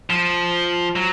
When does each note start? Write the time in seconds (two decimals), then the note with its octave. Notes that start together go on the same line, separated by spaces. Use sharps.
0.10 F3
0.96 F#3